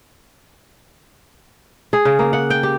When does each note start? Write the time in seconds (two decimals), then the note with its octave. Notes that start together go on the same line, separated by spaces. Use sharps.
1.93 G#4
2.05 C#3
2.19 A#3
2.33 F#5
2.50 G5
2.63 G4